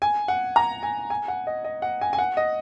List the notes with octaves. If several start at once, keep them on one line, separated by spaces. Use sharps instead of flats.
G#5
F#5
A#5
G#5
G#5
F#5
D#5
D#5
F#5
G#5
G#5
F#5
D#5